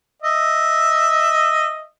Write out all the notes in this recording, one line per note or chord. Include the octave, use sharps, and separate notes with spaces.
D#5 E5